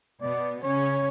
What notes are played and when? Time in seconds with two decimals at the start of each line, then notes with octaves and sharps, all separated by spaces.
0.21 B2 B3 D5
0.63 C#3 C#4 C#5